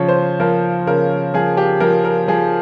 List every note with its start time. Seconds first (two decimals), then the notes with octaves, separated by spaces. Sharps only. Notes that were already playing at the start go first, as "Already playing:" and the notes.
Already playing: C#3 F3 C#5
0.08 C5
0.40 F3 A#4
0.87 C#3 A#4
1.34 F3 G#4
1.57 G4
1.80 F3 A#4
2.05 A#4
2.28 F3 G#4